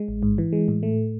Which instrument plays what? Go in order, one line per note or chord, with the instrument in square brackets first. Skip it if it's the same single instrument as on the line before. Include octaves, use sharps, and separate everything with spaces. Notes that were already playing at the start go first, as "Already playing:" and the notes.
Already playing: [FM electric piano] G#3
A1
G#2
E3
G#3
A2
A3